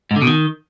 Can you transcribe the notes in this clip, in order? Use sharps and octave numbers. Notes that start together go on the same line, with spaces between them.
G#2
D3
B2
D#3